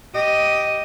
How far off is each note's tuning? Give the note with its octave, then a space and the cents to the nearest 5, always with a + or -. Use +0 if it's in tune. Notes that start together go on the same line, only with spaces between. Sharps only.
G4 -5 D#5 +0